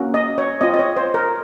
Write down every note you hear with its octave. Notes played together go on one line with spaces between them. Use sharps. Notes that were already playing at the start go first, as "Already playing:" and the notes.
Already playing: A#3 C#4 F#4
D#5
C#5
C4 F4 D#5
D#5
C#5
C5
A#4